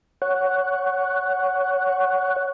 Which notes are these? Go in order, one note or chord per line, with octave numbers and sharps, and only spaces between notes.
C#5 F#5